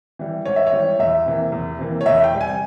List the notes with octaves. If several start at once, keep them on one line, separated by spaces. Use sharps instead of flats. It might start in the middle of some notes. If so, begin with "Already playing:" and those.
E3 G3
G#2 C#5
E5
C#5
E3 G3
E2 E5
C3 E3 A#3
E2
C3 E3 A#3
C#5
E2 E5
G5
C3 G3
G#5